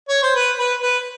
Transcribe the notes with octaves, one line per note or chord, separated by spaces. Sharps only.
C#5
C5
B4
B4
B4